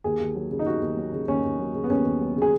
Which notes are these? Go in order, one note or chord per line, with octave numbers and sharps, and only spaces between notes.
D#2 G#4
D#2
F#3
C#3
D#4
D#2 F#4
D#2
F#3
C#3
D#2 C#4
D#2
F#3
C#3
B3
D#2 C#4
D#2
F#3
C#3
G#4